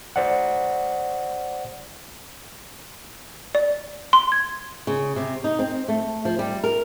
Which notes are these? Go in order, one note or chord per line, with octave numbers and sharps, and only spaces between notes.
C5 D5 F#5
D5
C6
G#6
C#3
C3
D#4
C4
A3
F3
G3
A#4